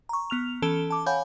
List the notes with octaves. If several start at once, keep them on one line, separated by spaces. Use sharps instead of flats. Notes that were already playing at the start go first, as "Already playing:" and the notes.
A#5 C#6
B3 F6 F7
E3 C#4 A4 A5 D7 G7
A5 D6
C#5 F5 F#5 G#5 B5 G6